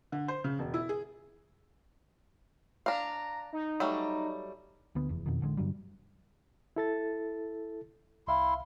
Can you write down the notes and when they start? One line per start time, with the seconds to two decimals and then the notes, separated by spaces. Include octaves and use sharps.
0.12 D3
0.28 C5
0.44 C#3
0.59 E1
0.74 E4
0.89 G#4
2.86 D4 F5 A#5
3.53 D#4
3.80 F#3 G3 A3
4.95 D2 D3 B3
5.09 F1 E2
5.26 F2 B2 D#3
5.41 A1 D3 F3 G#3
5.57 G2 D3 F#3 G3
6.76 E4 A4 A6
8.28 C2 E4 E5 F5 C6